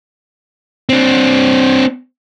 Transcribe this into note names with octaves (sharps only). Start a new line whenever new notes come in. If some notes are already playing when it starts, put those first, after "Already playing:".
C4 D4